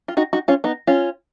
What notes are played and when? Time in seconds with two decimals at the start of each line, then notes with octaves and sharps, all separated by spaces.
0.08 F4
0.17 D#4 F#4
0.33 D#4 F#4
0.48 C#4 F4
0.64 B3 D#4
0.87 C#4 F4